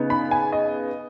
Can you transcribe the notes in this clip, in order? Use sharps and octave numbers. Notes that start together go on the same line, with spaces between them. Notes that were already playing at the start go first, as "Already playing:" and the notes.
Already playing: C#3 B3 D#4
B5
G#5
D#5